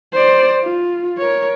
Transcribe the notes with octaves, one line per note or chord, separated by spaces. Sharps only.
C5 D5
F4
A#4 C#5